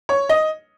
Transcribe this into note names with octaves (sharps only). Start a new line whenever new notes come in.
C#5
D#5